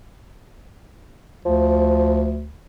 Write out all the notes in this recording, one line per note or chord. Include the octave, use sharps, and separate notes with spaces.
D2 F3